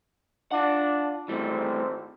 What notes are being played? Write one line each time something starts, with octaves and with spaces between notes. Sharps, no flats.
D4 F4 F#5
G#1 E3 G3 A3 C4